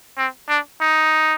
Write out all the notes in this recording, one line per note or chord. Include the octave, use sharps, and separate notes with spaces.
C4
D4
D#4